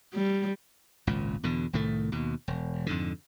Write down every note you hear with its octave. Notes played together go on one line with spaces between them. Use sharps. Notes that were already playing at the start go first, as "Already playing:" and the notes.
G3
G#1 C#2 A#2
E2 B2 D3
C2 A2 D#3 A3
D#2 B2
E1
F2 G#2 D3